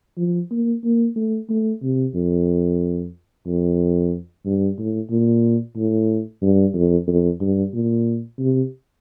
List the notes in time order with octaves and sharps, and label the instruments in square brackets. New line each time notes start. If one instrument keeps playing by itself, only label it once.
[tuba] F3
A#3
A#3
A3
A3
C3
F2
F2
G2
A2
A#2
A2
G2
F2
F2
G2
A#2
C3